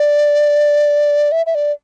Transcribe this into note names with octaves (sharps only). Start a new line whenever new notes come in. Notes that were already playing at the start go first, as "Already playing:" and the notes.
Already playing: D5
E5
E5
D5